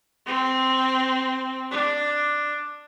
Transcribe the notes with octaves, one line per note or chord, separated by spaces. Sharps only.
C4
D4